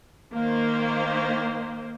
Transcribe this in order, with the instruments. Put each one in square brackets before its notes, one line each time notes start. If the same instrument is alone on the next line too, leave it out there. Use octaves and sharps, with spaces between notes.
[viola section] D#3 A#3 C5